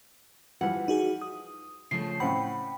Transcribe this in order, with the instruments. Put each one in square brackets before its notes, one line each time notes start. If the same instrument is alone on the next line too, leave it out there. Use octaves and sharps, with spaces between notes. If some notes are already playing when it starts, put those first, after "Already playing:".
[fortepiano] E3 F3 G3 [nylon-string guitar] F#5
[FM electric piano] D#4 F#4 G#4
D#6
[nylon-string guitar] C#3 F3 A3 [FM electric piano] C7
[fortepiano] A2 C#3 C4 [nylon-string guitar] F#5 [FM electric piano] G5 B5